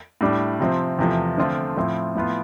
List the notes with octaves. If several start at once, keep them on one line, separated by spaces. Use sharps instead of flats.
A2 G3 D4
C3 F3 C4
E2 C3 F3 A3
D3 F3 A3 C4 F4
A2 F3 C4 E4
A2 F3 B3 F4